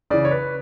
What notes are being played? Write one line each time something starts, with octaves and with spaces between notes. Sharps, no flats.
C#3 E3 D5
C#5
B4